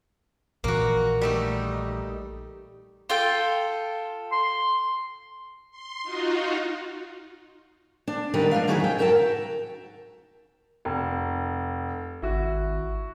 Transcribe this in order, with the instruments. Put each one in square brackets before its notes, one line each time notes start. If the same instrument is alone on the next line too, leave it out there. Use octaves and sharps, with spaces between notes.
[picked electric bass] A#1 A#2 E3 [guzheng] A#3 F#4
[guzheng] G3 A3 D#4
[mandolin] F4 A4 G5
[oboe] C6
[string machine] C6
D#4 F4 F#4
[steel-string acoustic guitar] D4
A2 D#3 G3 A#4 B4 F#5
F3 A3 D4 F5
D#3 F#3 E4 G#4 C#5
F2 G5
G#2 F#4 A#4 E5 G5 A5
[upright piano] F1
[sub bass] G#1 [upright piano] E4 F#4